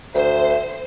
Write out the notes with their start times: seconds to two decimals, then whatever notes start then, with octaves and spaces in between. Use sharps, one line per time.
0.14 D2 C5 E5